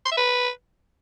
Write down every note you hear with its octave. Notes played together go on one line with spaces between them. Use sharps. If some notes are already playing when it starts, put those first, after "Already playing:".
C6
E5
B4